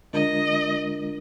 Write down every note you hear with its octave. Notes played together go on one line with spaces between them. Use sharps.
D3 G#3 D4 F4 A#4 D#5